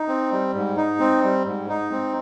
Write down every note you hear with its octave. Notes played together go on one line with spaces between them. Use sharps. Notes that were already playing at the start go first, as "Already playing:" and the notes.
Already playing: D#4
C4
G3
G#2
D#4
C4
G3
G#2
D#4
C4